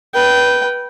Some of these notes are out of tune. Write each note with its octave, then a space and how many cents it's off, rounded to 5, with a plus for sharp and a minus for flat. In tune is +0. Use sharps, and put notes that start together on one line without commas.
B4 -15 G5 -20